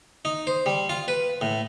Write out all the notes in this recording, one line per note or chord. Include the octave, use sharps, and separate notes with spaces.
D#4
C5
G3
F4
B4
A2